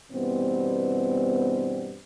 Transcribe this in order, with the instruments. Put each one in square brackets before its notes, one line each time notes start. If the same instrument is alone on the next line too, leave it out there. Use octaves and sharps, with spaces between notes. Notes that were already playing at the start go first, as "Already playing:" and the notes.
[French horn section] G2 B2 E3 G3 B3 C4